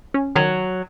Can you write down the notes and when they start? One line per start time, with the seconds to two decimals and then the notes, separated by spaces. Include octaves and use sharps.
0.14 C#4
0.36 D#3 F#3